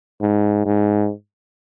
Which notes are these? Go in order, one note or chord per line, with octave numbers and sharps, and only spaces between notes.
G#2
G#2